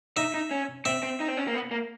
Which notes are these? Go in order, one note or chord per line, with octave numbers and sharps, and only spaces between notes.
D#4 E5
D#4
C#4
C4 E5
C4
D#4
C4
C#4
A#3
B3
A#3